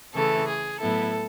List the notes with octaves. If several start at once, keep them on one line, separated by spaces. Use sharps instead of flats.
C#3 E3 A3 A4
G#4
A2 F#3 B3 E4 A4